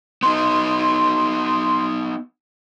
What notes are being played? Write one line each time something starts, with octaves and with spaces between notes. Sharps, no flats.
B3 D#4 C6